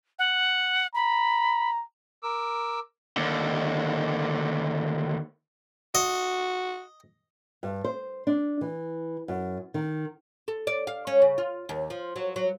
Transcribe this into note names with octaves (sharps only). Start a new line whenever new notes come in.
F#5
A#5 B5
A#4 D6 E6
D#2 D3
F#4 D#5
G2
C5
D4
E3
F#2
D#3
A4
D5
F5
C#4
C#3
F4
D#2
F3
F#3
F#3